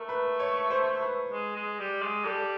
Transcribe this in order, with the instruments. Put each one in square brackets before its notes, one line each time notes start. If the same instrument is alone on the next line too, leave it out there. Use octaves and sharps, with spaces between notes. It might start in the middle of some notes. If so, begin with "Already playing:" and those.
Already playing: [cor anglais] A3 [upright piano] A#4
[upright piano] B4
C#5
C5
B4
[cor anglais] G#3
G#3
G3
G#3
[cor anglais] G3 [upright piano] A4